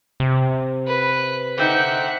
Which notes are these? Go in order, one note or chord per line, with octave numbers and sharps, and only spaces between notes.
C3
B4
D3 C4 D#4 E5 F#5